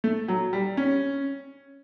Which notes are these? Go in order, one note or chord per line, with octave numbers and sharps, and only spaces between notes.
A3
F#3
G3
C#4